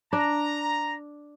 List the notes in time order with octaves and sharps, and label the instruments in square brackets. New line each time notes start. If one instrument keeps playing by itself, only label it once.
[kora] D4 [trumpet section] A#5